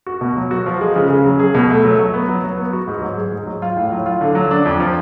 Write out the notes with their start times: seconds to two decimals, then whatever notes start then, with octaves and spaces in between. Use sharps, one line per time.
0.07 F#4
0.21 B2
0.37 F#3
0.51 F#4
0.66 F3
0.81 G#3
0.95 C#3
1.10 C#3
1.25 F#3
1.39 G#4
1.54 B2
1.70 A3
1.85 F#3
1.99 F#3
2.14 B3
2.29 F#3
2.44 F#3
2.58 B3
2.73 F#4
2.88 G#2
3.02 F#3
3.17 G#4
3.32 G#2
3.47 F#3
3.62 F4
3.77 A2
3.92 F#3
4.06 F4
4.21 D3
4.35 F#3
4.51 D4
4.65 F2
4.80 F3